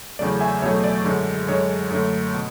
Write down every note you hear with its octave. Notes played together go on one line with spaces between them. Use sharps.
E2 C#3 F#3 A3 D5
E5 G#5
E2 B2 F#3 A3 C#5 E5
D5
F#2 D3 G#3
F#2 D3 G#3 C#5
F#2 D3 A3
B2